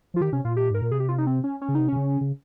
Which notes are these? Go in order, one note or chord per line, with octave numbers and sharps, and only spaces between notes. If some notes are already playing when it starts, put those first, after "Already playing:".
F3 F4
D#3 G4
C3 C#4
A#2 F4
G4
G#2 A#4
A#2
C3 G#4
G4
F4
D#4
C4
C#4
C#4
C#3
C3 D#4
C3 C#4
C#3
C#3